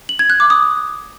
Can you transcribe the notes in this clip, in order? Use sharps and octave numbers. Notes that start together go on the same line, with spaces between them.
F#7
G#6
F#6
D6
D#6